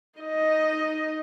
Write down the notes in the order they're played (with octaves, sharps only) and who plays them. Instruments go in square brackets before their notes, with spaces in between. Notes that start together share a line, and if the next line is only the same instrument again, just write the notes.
[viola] D#4 D#5